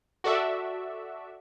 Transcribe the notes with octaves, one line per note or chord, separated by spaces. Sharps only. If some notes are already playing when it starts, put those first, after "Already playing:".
F#4 A4 D5 E5